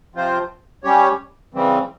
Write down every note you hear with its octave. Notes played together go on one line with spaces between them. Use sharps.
C3 F3 C4 F4 C5
G3 C#4 G4 C#5
C#3 E3 G3 C4